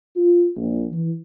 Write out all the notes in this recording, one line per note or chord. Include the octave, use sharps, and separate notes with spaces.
F4
A#1
E3